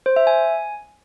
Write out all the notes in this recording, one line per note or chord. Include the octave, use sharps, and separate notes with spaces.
C5
E5
G#5